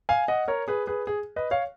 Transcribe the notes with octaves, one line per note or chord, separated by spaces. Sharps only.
F5 G#5
D#5 F#5
A#4 C#5
G#4 B4
G#4 B4
G#4
B4 D#5
C#5 F5